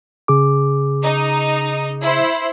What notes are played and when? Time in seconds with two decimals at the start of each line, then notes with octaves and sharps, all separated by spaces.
0.28 C#3 G#4 D6
1.03 D#4
2.01 E4 C5